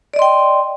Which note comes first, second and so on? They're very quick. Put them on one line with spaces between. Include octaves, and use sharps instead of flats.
D5 D#5 C6 G5